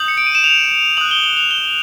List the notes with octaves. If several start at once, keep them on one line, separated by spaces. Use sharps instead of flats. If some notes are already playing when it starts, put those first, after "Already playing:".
Already playing: D#6 G6 F#7
C#7
D7
D#7
E7
F7
D#6 F#6 F#7
G7
F#7
F7
G7